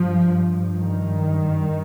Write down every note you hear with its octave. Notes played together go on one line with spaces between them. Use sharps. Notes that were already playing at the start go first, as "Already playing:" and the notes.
Already playing: G2 F3
D#3